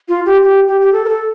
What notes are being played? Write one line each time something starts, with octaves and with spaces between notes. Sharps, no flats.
F4
G4
G4
G4
G4
A4
A#4
A4